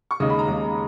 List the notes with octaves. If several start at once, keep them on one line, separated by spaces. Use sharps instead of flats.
C#6
D#2 C#3 G#3 D#4 D#6
B5
A#5
D#2 C#3 G#3 D#4